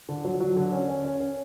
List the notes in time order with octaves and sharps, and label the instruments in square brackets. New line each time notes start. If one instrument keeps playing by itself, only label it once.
[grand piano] D3
F#3
F#3
D3
C#4
C#4
C#4
C#4